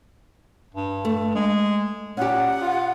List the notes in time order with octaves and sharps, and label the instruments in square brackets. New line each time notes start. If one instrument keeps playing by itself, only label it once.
[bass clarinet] G2
[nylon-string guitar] A3
[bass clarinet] G#3
[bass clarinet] A#2 [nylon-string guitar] C#4 G4 [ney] F#5
[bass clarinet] F4